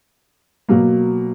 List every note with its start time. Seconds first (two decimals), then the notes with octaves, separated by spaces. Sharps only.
0.69 B2 F#3 A#3